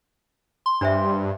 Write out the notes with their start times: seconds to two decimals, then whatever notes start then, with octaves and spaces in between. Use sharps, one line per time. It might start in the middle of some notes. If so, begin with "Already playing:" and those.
0.66 C6
0.81 G2 D4 C5 E5